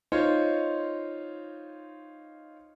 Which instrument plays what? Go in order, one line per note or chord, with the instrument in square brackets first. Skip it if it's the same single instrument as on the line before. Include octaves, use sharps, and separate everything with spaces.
[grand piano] D#4 F4 C5 C#5 D#5